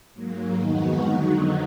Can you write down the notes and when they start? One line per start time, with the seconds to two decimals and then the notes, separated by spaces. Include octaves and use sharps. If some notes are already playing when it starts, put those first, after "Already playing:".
0.14 G#2 F#3 A#3
0.56 F2 D#3 G#3 B3 D#4 F#4
0.98 F2 D3 F#3